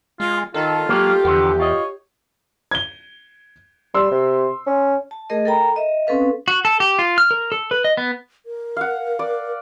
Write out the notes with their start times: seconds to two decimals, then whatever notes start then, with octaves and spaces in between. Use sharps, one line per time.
0.20 G#3 F4
0.54 D#3 F4 A4
0.89 F#3 G#3 A#3 G4
1.25 E2 D3 F3 B3
1.60 F4 C#5 D#5
2.71 G#6 G7
3.94 G3 C6 E6
4.11 C3
4.67 C#4
5.11 A5
5.30 A3 G#4 A#4 D#5
5.45 A4 A#4 G5 A#5 B5
5.76 D#5 E5
6.07 C4 C#4 A4 B4 F5
6.48 F#4
6.65 A4
6.80 G4
6.99 F4
7.18 F6
7.31 A#4
7.52 A4
7.71 B4
7.84 D#5
7.97 B3
8.46 A#4
8.77 F5 F#5
9.19 D5